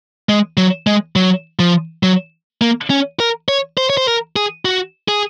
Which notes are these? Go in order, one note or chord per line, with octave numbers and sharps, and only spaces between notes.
G#3
F#3
G#3
F#3
F3
F#3
A#3
C#4
A#4
C#5
C5
C#5
C5
A#4
G#4
F#4
G#4